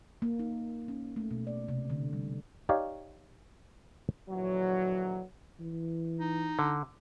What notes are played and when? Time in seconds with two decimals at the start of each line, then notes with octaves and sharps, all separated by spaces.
0.22 A#3
0.39 D#4
0.88 C#4
1.16 A3
1.31 B2
1.47 D5
1.68 C3
1.90 D3
2.13 G3
2.69 D#4 G4 C#5 D5 F5
4.30 A#1 D3 E3 F#3
5.60 E3
6.20 D#4
6.59 D3